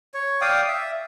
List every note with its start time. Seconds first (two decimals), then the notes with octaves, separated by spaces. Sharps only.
0.14 C#5
0.41 D5 F5 G5 D#6
0.68 E5